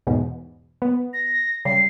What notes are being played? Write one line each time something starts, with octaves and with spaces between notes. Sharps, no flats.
E2 G#2 B2
B3
A#6
C#3 G3 C7